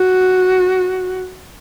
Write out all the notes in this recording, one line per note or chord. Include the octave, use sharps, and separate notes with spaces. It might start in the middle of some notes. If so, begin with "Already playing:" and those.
Already playing: F#4